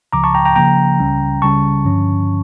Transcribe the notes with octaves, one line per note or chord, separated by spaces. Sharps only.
C#2 C#3 F3 A#5 D6
A5 C#6
G5 A#5
G5 A#5
C#3 F3 A#3 G5 A#5
C#2 C#3 G3 C#4
C#2 C#3 G3 C#4 A5 C#6
G2 D3 F3 C#4